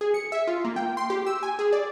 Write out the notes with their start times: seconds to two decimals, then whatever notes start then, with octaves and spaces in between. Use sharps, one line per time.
0.01 G#4
0.14 C#7
0.32 E5
0.47 F4
0.65 A#3
0.76 G5
0.97 C6
1.10 G4
1.26 E6
1.43 G#5
1.59 G#4
1.73 D5